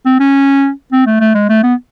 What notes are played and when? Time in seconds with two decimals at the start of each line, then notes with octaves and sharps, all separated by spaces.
0.06 C4
0.20 C#4
0.92 C4
1.07 A3
1.20 A3
1.35 G#3
1.49 A3
1.63 B3